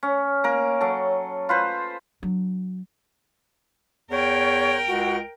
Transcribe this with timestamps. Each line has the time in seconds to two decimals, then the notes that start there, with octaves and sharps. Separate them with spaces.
0.03 C#4
0.44 A#3 A#4
0.81 F#3 A4
1.49 F4 B4 C5
2.23 F#3 D4
4.11 E2 A#4 C#5 G5
4.88 C#2 F#4